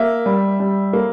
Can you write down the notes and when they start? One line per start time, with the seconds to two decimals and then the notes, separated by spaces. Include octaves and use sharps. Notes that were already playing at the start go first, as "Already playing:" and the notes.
Already playing: A#3 E5
0.26 G3
0.60 G3
0.93 A#3